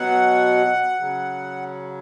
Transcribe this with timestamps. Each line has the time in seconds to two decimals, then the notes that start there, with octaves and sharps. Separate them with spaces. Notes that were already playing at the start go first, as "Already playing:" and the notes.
Already playing: B2 F#3 F#5
0.99 C#3 F#3